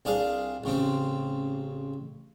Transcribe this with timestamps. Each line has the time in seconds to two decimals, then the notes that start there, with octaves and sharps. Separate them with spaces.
0.05 C2 D4 G#4 F5
0.64 A1 C#3 C4